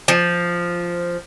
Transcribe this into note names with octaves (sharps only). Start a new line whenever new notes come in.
F3